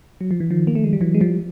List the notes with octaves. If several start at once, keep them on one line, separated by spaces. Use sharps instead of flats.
F#3
F3
E3
D#3 F3
A#3
A3
G#3
G3
E3 F#3
G#3
F3 G3